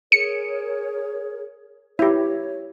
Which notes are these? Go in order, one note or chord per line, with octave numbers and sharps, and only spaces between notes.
G#4 A#4 C#5 C#7
E4 G4 C#5